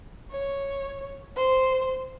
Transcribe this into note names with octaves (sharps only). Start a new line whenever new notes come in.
C#5
C5